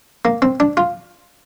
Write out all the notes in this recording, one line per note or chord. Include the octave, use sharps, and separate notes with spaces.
A#3
C4
D4
F4